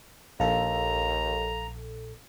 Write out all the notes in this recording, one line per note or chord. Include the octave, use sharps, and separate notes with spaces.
A#1 D#2 A4 F5 A#5